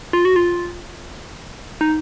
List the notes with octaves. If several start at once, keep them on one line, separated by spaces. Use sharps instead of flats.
F4
F#4
F4
D#4